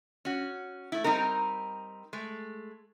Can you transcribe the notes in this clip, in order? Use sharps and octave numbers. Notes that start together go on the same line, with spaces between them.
C#4 F#4
A3 E4
G3 C4 D#4 A#4
G#3 A3